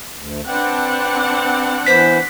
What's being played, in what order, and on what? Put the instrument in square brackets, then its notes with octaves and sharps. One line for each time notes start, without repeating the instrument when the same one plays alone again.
[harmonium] D2
[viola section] C4 D4 F#5 [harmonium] B4 G5
[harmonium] E3 B3 B4 [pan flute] C5 [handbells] B6